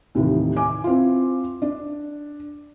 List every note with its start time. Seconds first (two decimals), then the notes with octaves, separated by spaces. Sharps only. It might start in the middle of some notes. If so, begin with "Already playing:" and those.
0.15 D#2 A2 C3 D#3 E3
0.56 G#5 D6
0.84 C4 E4 F4
1.62 D4